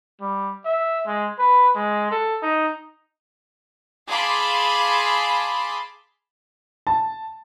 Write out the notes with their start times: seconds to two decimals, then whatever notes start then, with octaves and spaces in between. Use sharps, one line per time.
0.21 G3
0.65 E5
1.06 G#3
1.38 B4
1.75 G#3
2.11 A4
2.42 D#4
4.08 G#4 F5 A5 B5 C6 D6
6.87 A5